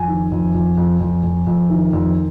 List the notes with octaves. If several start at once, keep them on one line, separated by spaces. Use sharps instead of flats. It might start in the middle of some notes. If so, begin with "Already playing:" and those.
Already playing: F2 G#5
D#3
F2
F2
F2
F2
F2
F2
D#3
F2